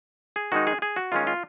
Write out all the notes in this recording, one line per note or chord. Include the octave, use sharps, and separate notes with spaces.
G#4
D#3 G#3 D#4 F#4
G#4
G#4
F#4
D#3 G#3 C#4 F4
F4